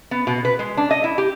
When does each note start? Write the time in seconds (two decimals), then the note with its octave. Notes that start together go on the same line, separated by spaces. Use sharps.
0.11 B3
0.27 B2
0.45 B4
0.59 G#3
0.77 D4
0.91 D#5
1.04 E4
1.18 G4